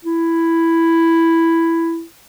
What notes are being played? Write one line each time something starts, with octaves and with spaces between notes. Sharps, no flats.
E4